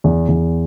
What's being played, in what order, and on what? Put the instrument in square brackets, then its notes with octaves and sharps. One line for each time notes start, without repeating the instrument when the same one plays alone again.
[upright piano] E2
E2